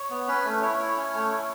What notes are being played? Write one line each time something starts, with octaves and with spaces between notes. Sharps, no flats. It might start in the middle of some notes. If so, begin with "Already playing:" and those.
Already playing: C#5
B3
C#4 B4
A3
E4 C#5
E4
C#4
A3
E4